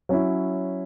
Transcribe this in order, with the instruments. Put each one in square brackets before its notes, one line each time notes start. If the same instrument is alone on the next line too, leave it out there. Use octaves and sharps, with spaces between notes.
[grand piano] F#3 C#4 E4